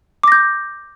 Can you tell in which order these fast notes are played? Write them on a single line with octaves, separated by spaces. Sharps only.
D6 A#6 G6